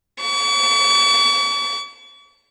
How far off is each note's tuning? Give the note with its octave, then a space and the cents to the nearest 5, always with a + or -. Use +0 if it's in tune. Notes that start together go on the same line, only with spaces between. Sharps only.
C#6 +45